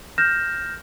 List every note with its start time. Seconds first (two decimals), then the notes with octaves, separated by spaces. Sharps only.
0.18 F6 G6 A#6 E7